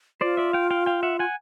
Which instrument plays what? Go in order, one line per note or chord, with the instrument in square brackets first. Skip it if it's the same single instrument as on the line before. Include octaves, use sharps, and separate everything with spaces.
[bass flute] F4 [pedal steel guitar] C5 D5
[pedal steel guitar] D5 E5
F5 G5
F5 G5
F5 G5
E5 F#5
F#5 G#5